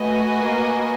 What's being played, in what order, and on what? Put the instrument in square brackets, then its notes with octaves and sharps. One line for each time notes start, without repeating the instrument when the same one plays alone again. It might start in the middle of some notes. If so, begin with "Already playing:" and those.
Already playing: [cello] A3 [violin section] F#4 B4 D#5 G#5
[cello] A#3